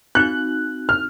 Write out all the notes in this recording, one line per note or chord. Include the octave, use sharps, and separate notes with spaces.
C4 D#4 F#4 F#6
F6